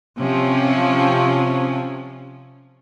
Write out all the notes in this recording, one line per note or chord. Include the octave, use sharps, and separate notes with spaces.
C3 F3 C#4